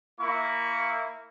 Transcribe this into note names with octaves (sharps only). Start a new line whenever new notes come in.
A#3 E4 C#6